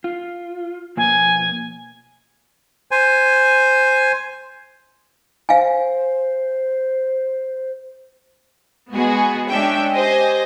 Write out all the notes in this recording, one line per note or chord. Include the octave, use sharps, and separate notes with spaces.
F4
B2 F3 A#3 G#5
C5 G#5
C5 F5 G#5
G#3 B3 F#4 G#4
G#3 C#4 D4 E5 G5
G4 C5 D#5 G#5